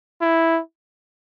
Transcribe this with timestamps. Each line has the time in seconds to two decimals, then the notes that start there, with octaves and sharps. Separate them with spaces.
0.21 E4